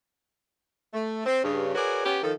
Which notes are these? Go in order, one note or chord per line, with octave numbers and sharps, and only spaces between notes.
A3
C4
G2 C#3
F#4 G#4 A#4 B4 C#5 D5
B3 C#4 G4
D#3 F3 A4